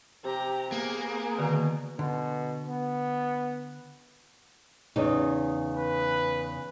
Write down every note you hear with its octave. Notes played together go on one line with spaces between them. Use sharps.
C3 G4 A#5
A#3 B3 G#4
B2 D3 D#3
B2 D3
B3
E2 C#3 D#4
B4